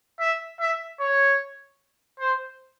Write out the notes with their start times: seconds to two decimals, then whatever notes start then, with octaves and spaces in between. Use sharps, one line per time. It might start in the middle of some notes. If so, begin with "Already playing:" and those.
0.20 E5
0.60 E5
1.00 C#5
2.20 C5